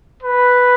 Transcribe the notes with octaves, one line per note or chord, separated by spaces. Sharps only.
B4